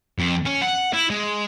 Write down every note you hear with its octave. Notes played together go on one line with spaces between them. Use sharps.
F2
C#4
F#5
E4
G#3